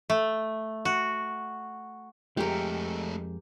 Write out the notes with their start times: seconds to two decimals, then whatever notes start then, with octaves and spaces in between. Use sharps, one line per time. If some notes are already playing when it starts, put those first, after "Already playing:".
0.10 A3
0.85 F#4
2.37 F2 G#3 A3 D#4 G4 A#4